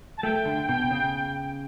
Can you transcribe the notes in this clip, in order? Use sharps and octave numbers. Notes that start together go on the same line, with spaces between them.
A5
A3 G5
D3
B2
C#3